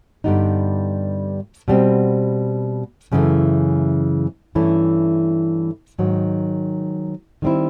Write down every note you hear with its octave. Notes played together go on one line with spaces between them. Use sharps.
G2 D3 G3 B3 D#4
B2 G3 C4
F#2 C#3 E3 A3
G2 E3 A3 C#4 E4
G#2 D#3 F#3
D#3 G3 C4 E4